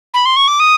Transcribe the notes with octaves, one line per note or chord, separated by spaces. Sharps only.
B5
C6
C#6
D6
D#6